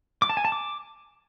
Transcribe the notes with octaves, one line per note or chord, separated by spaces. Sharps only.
D6
A5
G#5
A5
D6